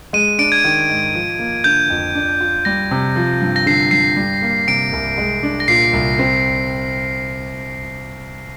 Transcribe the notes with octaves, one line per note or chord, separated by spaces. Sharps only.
G#3 D#7
D4 D7
G#6
D#3
G#2
F3
A#3
D3 G6
F2
D4
F4
G3 A#6
C3
F3
G2
A#6
D3 C7
G2 C7
G3
A#3
C3 D7
C2
G#3
D4
A#6
A#2 C7
C2
C4